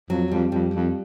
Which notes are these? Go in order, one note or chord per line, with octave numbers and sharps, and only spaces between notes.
F2 F#3
F2 G3
F2 G3
F2